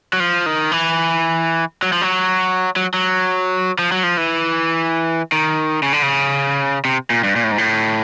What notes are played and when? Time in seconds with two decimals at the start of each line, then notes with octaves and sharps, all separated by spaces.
0.13 F#3
0.20 F3
0.46 D#3
0.72 E3
1.83 F#3
1.92 F3
2.02 F#3
2.76 F#3
2.94 F#3
3.79 F3
3.92 F#3
4.03 F3
4.17 E3
5.32 D#3
5.83 C#3
5.93 D3
6.02 C#3
6.85 C3
7.10 A#2
7.24 G2
7.36 A#2
7.44 A2
7.52 G#2
7.58 A2